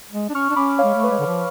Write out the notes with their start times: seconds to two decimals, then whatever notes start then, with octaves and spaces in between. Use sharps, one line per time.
0.12 G#3
0.29 D4
0.34 C#4 C#6 F6
0.50 D4
0.56 C#4 B5 D6
0.78 C#5 F5
0.84 G#3
0.94 A3
1.03 B4
1.11 G#3 C#5
1.19 D3
1.27 F3